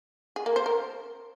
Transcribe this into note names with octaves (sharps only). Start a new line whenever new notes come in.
G#4
A#3
C5
A#4